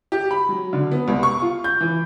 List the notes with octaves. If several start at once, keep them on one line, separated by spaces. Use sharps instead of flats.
G4
B5
F#3
D3
B3
C2
C#6
F4
G6
E3